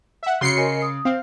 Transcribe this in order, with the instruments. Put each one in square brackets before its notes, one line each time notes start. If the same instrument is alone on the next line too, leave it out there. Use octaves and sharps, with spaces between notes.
[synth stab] E5 F#5
[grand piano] C#3 [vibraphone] F#4 C#5 [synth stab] C6 C7 C#7
[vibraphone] A#4 D#5 G#5
D#6
[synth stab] C4 [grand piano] F5